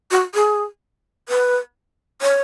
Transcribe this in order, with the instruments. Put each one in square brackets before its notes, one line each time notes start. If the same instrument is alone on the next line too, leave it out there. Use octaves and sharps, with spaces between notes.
[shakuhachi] F#4
G#4
B4
C#5